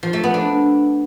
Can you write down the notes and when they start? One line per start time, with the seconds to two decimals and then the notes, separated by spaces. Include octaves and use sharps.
0.03 F3
0.13 A3
0.24 B3
0.34 D4